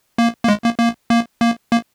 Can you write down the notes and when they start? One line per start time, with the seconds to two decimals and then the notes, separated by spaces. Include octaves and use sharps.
0.18 A#3
0.43 A#3
0.48 G#3
0.64 A#3
0.79 A#3
1.10 A#3
1.41 A#3
1.72 A#3